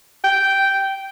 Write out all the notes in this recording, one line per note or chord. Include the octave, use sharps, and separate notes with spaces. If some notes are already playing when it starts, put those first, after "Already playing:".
G5